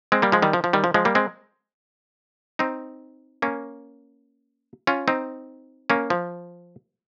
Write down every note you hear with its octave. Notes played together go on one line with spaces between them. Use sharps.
G#3 C4
G3 A#3
F3 G#3
D#3 G3
F3
F3
D#3 G3
F3
F3 G#3
G3 A#3
G#3 C4
C4 D#4
A#3 C#4
C#4 F4
C4 D#4
A#3 C#4
F3